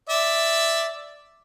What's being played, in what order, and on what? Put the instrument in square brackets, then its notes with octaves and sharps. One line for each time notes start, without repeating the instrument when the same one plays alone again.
[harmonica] D5 E5